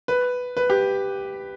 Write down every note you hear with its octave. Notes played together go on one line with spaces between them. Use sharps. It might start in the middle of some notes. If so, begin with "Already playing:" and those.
B4
B4
G4